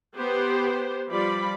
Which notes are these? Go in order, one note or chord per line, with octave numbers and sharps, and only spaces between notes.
B3 G4 C5
F3 G3 D5 B5